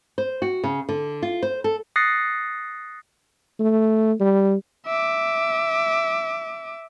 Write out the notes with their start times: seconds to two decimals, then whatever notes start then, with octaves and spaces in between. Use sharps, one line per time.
0.18 C5
0.42 F#4
0.64 C#3
0.89 D3
1.22 F4
1.42 C5
1.64 A4
1.96 D#6 F#6 A6 A#6 C7 C#7
3.59 A3
4.20 G3
4.86 E5 D6